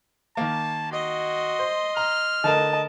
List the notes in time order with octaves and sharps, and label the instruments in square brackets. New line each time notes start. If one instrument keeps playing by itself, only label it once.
[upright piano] D#3 A#3 [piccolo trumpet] A5
[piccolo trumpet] F#4 [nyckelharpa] D#5 C6
[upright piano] C5
[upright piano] A#5 [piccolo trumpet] F6
[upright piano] D3 A3 A#4 [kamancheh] D#5 A5